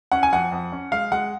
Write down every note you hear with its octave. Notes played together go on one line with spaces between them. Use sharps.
C#4 F#5
G#5
F2 F#5
F2
C#4
G#3 F5
G#3 F#5